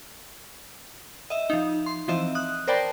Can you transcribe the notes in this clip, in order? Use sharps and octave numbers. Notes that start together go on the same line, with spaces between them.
D#5 E5
F3 D#4
C6
E3 F3 C4 D#5 E5
D#6 F#6
A#4 C5 D5 G5 A5 B5